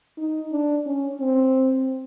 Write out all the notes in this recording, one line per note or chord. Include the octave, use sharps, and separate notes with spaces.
D#4
D4
C#4
C4